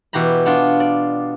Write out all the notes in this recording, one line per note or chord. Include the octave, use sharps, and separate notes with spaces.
B2 E3 G4 A#5 B5
B3 D4 F4
D5